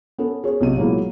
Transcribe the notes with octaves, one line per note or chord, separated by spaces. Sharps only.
B3 C#4 A4
G#4 C#5
B1 C3 D#7
A#2 F#3 G#3 A#3 B3 E4